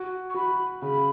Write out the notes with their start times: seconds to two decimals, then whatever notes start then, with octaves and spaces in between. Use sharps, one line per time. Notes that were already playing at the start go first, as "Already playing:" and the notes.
Already playing: F#4
0.29 C#6
0.34 F#4 B5
0.82 C#3 B5